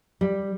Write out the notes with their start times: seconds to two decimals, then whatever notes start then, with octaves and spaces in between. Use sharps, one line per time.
0.21 G3